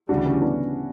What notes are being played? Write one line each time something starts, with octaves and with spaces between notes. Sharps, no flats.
D2 C#3 E3 G3 D4 F#4
C#4 E4
B3 D4